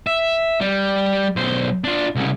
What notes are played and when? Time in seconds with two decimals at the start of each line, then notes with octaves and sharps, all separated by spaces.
0.07 E5
0.61 G3
1.36 B1 C5
1.84 D4 F4
2.15 C2 C#3